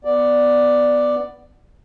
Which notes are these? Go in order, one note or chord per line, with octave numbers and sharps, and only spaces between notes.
B3 D5